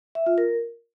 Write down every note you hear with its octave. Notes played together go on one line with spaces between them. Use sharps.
E5
F4
A#4